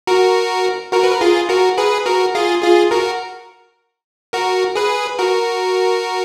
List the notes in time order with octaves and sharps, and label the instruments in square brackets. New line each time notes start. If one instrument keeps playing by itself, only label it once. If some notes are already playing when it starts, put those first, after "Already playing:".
[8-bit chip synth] F#4 A#4
F#4 A#4
B4
A#4
F4 G#4
F#4 A#4
G#4 B4
F#4 A#4
F4 G#4
F4 G#4
F#4 A#4
F#4 A#4
G#4 B4
F#4 A#4